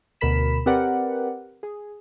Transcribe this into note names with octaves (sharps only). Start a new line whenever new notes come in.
D2 B2 A#4 B5 B6 E7
C4 G4 A#4 B4 D5 F#5
G#4